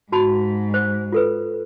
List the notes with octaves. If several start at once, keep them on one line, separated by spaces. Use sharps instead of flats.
G#2 F#4 A5 B5
C5
F4 A4 B4